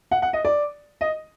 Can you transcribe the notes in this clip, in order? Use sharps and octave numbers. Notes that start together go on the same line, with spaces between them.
F#5
F#5
D#5
D5
D#5